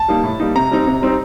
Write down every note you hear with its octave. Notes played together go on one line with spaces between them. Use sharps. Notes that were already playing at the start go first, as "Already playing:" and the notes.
Already playing: A5
G3 A#3 D#4
A2
G3 A#3 D#4
C3 A#5
G3 C4 D#4
C3
G3 C4 D#4